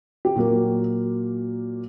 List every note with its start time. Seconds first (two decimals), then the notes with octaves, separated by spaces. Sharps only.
0.25 G4
0.36 A#2 F#3 A#3 F#4